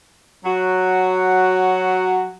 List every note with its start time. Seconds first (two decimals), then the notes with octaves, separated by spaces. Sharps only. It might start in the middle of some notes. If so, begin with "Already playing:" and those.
0.45 F#3 F#4